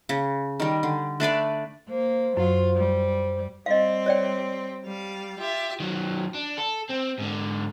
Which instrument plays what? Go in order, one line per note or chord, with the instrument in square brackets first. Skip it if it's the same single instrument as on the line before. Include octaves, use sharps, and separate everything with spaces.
[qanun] C#3
D#3 G3
D3
A3 D4 B4 D5
[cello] A#3 [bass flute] C5
[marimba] F#2 [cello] F#3 F4
[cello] G3
[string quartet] G3 C4 [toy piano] D#5 F5
[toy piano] C#5 D5 G5
[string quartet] G3 F5
F4 G4 E5
[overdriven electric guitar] D#3 F#3
D4
A4
C4
G#2 D3